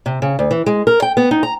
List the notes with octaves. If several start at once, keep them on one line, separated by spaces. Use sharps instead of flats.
C3
C#3
D2
E3
G#3
A#4
G5
B3
D#4
A#5